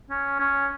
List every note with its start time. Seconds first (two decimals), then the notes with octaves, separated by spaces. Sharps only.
0.10 C#4
0.39 C#4